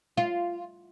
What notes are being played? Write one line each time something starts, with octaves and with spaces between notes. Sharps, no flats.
F4